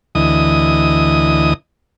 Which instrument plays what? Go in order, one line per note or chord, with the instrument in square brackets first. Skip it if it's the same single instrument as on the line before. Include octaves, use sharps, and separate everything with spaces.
[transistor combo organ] D2 E3 D#5 D#6